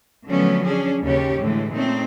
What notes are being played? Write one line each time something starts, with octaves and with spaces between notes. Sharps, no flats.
D3 F3 F#3 A3 B3 C#4
C#4 D4 G#4
D#2 C#3 C#4 G4 C#5
A2 D3 E3 G#3
A#2 A3 C4 C#4 D#4